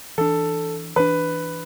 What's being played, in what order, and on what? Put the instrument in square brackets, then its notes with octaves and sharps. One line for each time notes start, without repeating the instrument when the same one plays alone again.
[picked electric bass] E3 D4 [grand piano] A4
[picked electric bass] E3 D4 [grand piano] B4